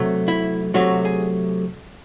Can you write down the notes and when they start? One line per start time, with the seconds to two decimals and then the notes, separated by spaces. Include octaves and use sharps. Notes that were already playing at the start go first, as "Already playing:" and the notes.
Already playing: C3 F#3 A3
0.28 E4
0.74 C3 F#3 A3 F#4
1.05 G#4